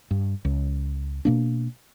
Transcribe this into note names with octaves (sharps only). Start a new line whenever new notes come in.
G2
C#2
B2 A#3 D4